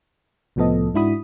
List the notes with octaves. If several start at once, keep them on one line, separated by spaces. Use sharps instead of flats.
C2 A2 F3 B3 A4 D#5
G#2 D4 E4 F#4 B5 D#6